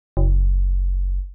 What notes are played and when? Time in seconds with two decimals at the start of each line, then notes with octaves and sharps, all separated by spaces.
0.17 F#1